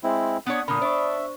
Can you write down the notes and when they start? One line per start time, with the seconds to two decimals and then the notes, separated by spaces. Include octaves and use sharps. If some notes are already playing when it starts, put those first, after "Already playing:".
0.04 G#3 C4 E4
0.46 B3 D4 C#5 F#5 D#6
0.68 A#2 D3 A#4 B5 D#6
0.81 D4 C5 E5 C#6